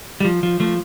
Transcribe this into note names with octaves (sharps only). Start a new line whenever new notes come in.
G3
F3
F3
F3 A3